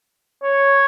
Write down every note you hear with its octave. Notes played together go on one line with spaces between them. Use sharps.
C#5